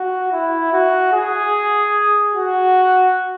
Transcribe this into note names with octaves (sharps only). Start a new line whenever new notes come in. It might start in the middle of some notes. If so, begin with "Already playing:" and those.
Already playing: F#4
E4
F#4
G#4
F#4